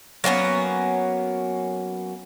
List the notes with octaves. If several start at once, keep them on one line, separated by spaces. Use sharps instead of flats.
F#3 A#3 B3 C#4